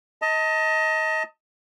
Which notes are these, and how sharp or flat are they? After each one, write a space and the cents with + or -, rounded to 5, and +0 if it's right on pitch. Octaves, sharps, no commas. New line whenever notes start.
D#5 +25 A5 +30